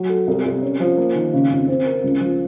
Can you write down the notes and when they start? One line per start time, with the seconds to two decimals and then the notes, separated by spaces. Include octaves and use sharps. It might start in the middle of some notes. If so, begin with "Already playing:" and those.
Already playing: F#3
0.09 A4
0.28 C2
0.45 C2
0.63 C#4
0.80 F3
0.97 A#3
1.15 D#3
1.33 C#3
1.51 F2
1.68 C4
1.85 A#4
2.04 C#2
2.21 F3